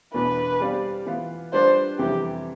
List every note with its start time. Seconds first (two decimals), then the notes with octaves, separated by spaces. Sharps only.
0.14 E2 B2 B3 D4 B4
0.60 G3 C4 G4 D5 F5
1.06 E3 B3 F4 B4 F5
1.53 G3 D4 F4 B4 C5 D5
1.99 F2 C3 E3 G3 B3 G4